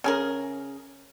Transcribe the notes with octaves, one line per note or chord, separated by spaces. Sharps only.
C#3 G#4 A#4